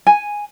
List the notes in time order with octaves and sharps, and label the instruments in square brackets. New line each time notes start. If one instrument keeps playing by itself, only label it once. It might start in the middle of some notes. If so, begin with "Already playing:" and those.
[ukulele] G#5